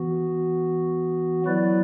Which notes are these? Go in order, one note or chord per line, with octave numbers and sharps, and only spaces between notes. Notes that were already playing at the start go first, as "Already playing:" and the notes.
Already playing: E3 B3 F#4
F#3 B3 E4 B4 D5